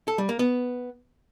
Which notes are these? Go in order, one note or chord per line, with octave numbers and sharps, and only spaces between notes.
A4
G3
A#3
B3